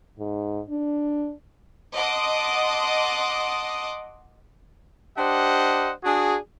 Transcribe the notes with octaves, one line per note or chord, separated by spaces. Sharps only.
G#2
D4
D#5 F#5 A5 C6 D6 D#6
D4 G4 C5 D#5 F#5
D4 F#4 G#4